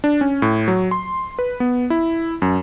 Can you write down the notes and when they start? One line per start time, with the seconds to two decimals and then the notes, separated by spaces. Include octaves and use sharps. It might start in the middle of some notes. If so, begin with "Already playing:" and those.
0.04 D4
0.21 C#4
0.42 A2
0.68 F#3
0.91 C6
1.39 B4
1.60 B3
1.90 E4
2.42 F#2